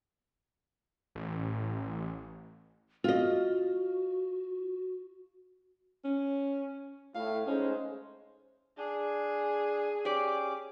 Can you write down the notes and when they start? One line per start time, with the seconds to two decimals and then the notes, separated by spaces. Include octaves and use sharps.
1.15 A1
3.04 F4 F#4 D#5
6.04 C#4
7.15 A2 F5
7.47 G#2 G#3 C#4 C5
8.78 D4 G#4
10.05 C#4 G4 D5 D6